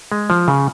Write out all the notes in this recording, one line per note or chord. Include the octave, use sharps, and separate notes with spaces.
G#3
F3
C#3